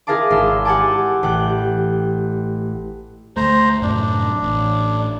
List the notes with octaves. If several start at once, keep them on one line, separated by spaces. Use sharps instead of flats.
E4 G#4 A#4 F5 A5 D6
G#1 G#3 C6 E6
G4 F#5 G#5 A5 D6
A1 G4 G5 F#6
D2 A3 C5 A#5
F#2 A2 C3 D4
A1